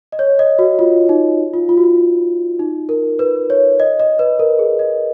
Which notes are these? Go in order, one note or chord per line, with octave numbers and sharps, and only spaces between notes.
D#5
C#5
D#5
F#4
F4
D#4
F4
F4
F#4
F4
D#4
A#4
B4
C#5
D#5
D#5
B4
A#4
G#4
D#5